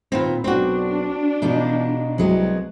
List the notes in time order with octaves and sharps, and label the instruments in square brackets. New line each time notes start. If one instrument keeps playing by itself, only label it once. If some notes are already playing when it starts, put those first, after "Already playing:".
[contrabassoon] D#2 [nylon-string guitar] A#2 B3 C4
[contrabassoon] B1 [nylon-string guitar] C4 F#4 [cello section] D4
[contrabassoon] E2 [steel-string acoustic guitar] B2 D#4 F4
[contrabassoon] C2 [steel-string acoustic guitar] F#3 G#3 B3